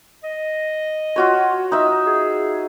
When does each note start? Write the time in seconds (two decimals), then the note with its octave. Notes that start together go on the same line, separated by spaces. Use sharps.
0.24 D#5
1.16 F4 F#4 C#5
1.72 D#4 E5
2.06 G#4